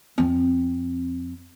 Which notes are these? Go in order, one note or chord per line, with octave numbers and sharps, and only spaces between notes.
F2 C4